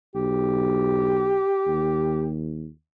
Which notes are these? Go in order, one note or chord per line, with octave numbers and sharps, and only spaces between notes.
B1 G4
D#2